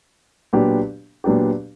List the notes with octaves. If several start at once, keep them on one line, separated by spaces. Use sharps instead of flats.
A#2 F#3 B3 D4 G4
A#2 F#3 B3 D4 G4